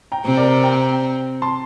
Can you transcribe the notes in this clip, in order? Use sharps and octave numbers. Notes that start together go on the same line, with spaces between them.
G5 A#5
C3 C4
A#4 D5
G5 A#5
A5 C6